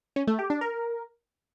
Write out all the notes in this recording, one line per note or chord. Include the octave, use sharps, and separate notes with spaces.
C#4
A3
G4
D4
A#4